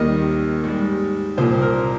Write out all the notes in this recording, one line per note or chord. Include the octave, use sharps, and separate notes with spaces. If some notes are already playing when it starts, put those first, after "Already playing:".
Already playing: D#2 D#3 G3 D#5
G#2 G3
C2 A#2 F3 C5
A#4